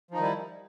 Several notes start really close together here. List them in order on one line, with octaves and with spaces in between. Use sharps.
F3 D#4 D#3 G3 E4